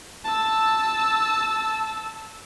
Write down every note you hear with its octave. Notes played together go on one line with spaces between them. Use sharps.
A5 E6